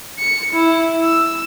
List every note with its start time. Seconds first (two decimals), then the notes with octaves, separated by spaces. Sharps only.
0.19 C#7
0.53 E4
1.03 E6